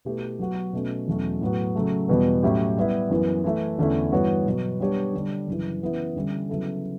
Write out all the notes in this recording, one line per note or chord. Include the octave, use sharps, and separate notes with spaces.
B2 A3 E4 G4 B4
F#3 B3 F#4
B2 A3 C#4
E2 B2 F#3 A3 C#4
A2 F#3 B3 F#4
C#3 F#3 A3
E2 B2 G3 B3
A2 F#3 C#4 E4 G4
G3 B3 E4
F#2 E3 B3
E3 A3 E4
E2 D3 A3 C#4 E4
G2 E3 B3 F#4 C#5
B2 F#3 B3 F#4
G3 B3 D4 G4 C#5
D3 G3 D4
F#2 C#3 E3
C#3 E3 B3 E4
D3 G3 C#4 E4
C#3 F#3 B3 E4 A4